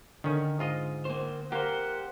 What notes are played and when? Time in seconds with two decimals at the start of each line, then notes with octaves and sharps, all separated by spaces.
0.24 D3 D#3 C#4
0.59 G#2 F4 D#5
1.05 A#3 C5
1.52 A#3 G4 C5 F#5